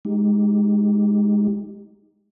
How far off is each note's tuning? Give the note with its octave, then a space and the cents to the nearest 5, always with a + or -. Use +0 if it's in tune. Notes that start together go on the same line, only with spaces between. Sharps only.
G#3 +0 D#4 +0 G4 +0